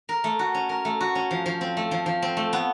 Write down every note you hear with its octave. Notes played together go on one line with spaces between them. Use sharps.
A#4
A3
F#4
C#4
A#4
A3
F#4
C#4
F3
F3
C4
A3
F3
F3
C4
A3
B3